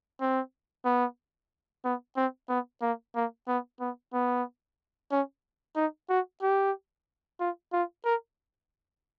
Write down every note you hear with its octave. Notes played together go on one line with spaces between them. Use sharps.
C4
B3
B3
C4
B3
A#3
A#3
B3
B3
B3
C#4
D#4
F#4
G4
F4
F4
A#4